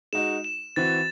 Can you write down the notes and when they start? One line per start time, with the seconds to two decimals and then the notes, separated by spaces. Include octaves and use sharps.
0.13 G#3 D#4 F#4 E7
0.44 E7
0.76 E3 C4 F#4 A6